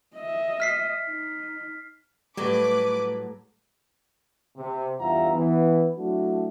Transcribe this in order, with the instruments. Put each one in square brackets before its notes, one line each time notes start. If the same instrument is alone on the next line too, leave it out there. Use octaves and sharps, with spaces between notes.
[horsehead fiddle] D#5 E5
[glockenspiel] F6 B6 C7
[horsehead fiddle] D#4
[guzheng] A2 F#3 [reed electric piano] G3 A3 [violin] B4 [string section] D6
[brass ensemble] C3
E2 G2 F4 E5 F#5 A#5
E3 B3
F#3 A3 D4 E4 F#4